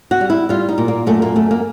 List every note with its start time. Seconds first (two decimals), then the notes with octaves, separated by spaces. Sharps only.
0.11 F#4
0.21 G3
0.30 E4
0.49 G3 F4
0.69 D#4
0.78 A#2
0.88 A#3
1.06 F#2 A3
1.22 A#3
1.36 F#2 A3
1.51 A#3